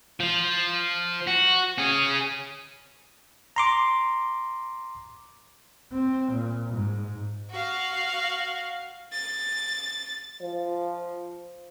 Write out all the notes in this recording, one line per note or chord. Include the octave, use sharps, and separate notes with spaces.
F3
F#4
C#4 G#4
A#5 C6 D6
C4
A#2
G#2
F#4 F5
A6
F3